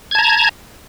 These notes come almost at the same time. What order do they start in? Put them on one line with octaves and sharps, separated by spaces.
G#6 A5 A#5